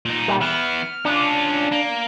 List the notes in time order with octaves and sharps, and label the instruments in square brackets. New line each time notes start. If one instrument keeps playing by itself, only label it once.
[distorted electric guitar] A#2 D#4
[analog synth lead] G3
[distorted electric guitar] E3 B3 [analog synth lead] F6
[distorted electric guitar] C#4 F4 [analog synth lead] D4
[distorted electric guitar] A#3